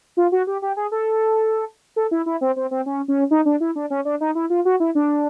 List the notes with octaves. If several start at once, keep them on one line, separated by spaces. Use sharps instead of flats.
F4
F#4
G4
G4
G#4
A4
A4
E4
E4
C4
C4
C4
C#4
C#4
D#4
D4
E4
D4
C#4
D4
D#4
E4
F4
F#4
E4
D4